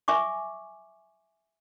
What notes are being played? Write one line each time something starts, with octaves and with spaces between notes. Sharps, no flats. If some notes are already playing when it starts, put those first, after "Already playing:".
E5 G#5 C#6 D6